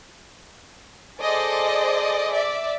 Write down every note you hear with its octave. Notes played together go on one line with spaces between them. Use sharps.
G#4 A4 C5 D5 D#5
D5 E5